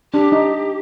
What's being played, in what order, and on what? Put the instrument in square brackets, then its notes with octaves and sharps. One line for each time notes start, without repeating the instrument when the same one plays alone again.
[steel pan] D4 [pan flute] G4
[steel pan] D#4